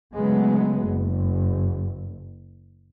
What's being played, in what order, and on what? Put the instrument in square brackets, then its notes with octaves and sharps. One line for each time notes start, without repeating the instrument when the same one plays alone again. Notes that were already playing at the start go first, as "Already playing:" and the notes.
[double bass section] C#3 F#3 G#3 A3 B3
F#1